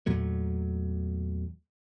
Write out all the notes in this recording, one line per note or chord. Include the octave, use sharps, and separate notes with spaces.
E2 A#2 F#3 A3